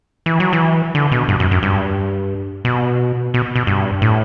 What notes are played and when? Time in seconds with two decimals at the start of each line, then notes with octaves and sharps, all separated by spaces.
0.26 E3
0.40 F#3
0.53 E3
0.95 D3
1.12 B2
1.28 G2
1.40 F#2
1.51 F#2
1.63 G2
2.65 B2
3.34 B2
3.56 B2
3.67 G2
4.02 A2